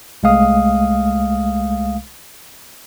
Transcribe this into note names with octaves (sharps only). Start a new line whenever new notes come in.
C2 G#3 A3 F5 D#6